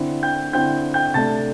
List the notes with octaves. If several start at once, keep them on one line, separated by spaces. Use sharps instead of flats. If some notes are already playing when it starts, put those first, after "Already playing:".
Already playing: D3 C4 E4
G5 G6
D3 C4 E4 G5 G6
G5 G6
C3 A3 D4 A5 A6